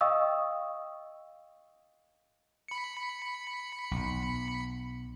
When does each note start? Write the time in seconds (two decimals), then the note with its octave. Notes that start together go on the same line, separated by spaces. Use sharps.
0.01 D#5 F5 G5 C#6 D#6 E6
2.68 B5 C#7
3.91 B1